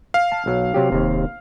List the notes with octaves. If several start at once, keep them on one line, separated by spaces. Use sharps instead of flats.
F5
A5
B1 F#3
C3 F#3 G4
D#1 D#2 C3